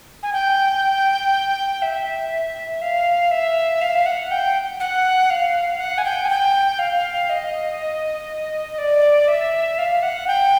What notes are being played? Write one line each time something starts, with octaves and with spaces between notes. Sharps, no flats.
G#5
G5
E5
F5
E5
F5
F#5
G5
F#5
F5
F#5
G#5
G5
G#5
G5
F5
D#5
D5
E5
F5
F#5
G5